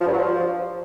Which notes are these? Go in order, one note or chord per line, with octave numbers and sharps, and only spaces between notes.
F3
G2
F#3
F3